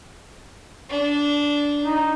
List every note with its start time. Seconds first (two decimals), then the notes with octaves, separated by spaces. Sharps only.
0.90 D4
1.82 D#4